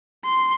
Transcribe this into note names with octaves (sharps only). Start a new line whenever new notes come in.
C6